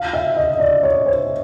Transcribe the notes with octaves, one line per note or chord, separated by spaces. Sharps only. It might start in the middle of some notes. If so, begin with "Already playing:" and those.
Already playing: F5
E5
D#5
D#5
D5
C#5
C5